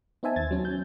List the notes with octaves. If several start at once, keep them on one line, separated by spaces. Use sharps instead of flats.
B3 D#4 C5 E5 G#5 A5
D#2 G#6 A6
F#3 C#4
G6